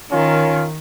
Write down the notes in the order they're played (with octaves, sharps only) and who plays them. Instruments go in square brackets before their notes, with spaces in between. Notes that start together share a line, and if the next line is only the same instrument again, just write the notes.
[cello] D#3 [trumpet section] C#4 F4 A#4